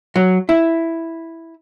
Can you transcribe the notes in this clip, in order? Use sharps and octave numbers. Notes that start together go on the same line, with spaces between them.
F#3
E4